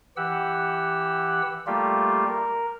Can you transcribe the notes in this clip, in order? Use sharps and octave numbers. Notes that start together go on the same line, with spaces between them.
E3 G4 F#5 E6
G3 A3 A#3 F4 G4
A#4